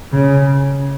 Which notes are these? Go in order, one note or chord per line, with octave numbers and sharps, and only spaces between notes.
C#3